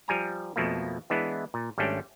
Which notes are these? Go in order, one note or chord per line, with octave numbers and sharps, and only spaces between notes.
F3 G3 G#5 A#5
F2 B2 F3 A3 A#3
E3 G#3 B3 D4 E4
A#2
G#1 G3 A3 C#4 D4 G5